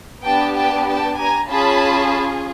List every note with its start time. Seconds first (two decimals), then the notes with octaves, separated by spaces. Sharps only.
0.25 B3 D4 G4 G5 A5
0.56 G5 A5
0.87 G5 A5
1.18 G#5 A#5
1.49 C#4 F4 G#4 A5 B5